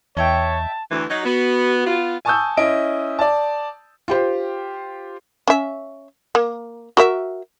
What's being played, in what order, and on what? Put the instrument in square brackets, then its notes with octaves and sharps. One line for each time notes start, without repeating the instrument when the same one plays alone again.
[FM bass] E2 [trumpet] C#5 [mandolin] D#5 E5 G5 [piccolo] A5
[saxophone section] D2 E3
[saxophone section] F#3 D#4 [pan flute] D#5
[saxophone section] B3 [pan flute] F#4
[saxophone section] B3 F4
[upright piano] G#5 A5 C#6 D#6 E6 G6
C#4 E4 D#5 D7
D5 A5
[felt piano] F4 G4 C5
[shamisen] C#4 E5
A#3
F#4 A#4 E5